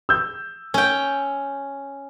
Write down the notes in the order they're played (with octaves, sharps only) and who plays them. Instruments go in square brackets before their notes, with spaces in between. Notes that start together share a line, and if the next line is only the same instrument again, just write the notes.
[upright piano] E6 G6
[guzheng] C#4 G5